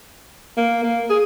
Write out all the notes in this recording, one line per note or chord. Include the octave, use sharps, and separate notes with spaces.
A#3
A#3
G#4